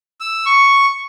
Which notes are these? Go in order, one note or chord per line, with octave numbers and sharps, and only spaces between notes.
E6
C#6